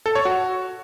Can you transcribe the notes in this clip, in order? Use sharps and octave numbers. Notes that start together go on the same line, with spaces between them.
A4
C#5
F#4